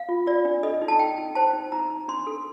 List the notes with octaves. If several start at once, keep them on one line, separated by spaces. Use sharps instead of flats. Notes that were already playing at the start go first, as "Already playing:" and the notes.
Already playing: F5
F4
F4 D5
D4
A4 D#5
D#4
A5
D#4 G5
D#4
C5 A5
D#4
D#4 A#5
D#4
D4 C6
A4